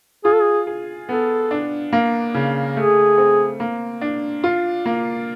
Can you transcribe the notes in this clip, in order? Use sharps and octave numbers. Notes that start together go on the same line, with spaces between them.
F4 G#4
A4
G#4
G#4
B3 A4
D4
A#3
C#3
A3 G#4
C4
A#3
D4
F4
A#3